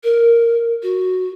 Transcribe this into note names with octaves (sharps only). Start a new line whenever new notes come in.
A#4
F#4